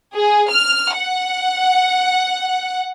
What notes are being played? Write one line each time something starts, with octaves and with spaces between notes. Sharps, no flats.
G#4
F6
F#5